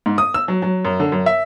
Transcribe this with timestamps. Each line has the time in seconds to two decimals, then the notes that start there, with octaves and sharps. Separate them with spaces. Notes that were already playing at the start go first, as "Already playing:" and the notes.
0.06 G#2
0.18 D#6
0.34 E6
0.48 F#3
0.62 F#3
0.85 F#2
1.00 D3
1.12 F#2
1.26 E5